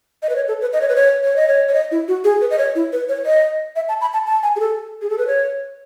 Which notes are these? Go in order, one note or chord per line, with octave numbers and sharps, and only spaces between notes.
D#5
B4
C#5
A4
B4
D#5
C#5
B4
C#5
C#5
D#5
C#5
C#5
D#5
E4
F#4
G#4
B4
D#5
C#5
E4
B4
C#5
D#5
E5
A5
B5
A5
A5
G#5
G#4
A4
G#4
A4
B4
C#5